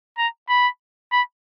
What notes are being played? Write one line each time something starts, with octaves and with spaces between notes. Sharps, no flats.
A#5
B5
B5